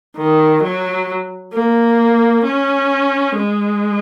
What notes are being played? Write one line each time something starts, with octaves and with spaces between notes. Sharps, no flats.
D#3
F#3
A#3
C#4
G#3